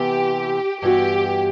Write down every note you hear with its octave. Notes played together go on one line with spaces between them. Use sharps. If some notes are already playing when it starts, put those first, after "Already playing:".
Already playing: C3 E3 B3 G4
G2 E3 B3 F#4 G4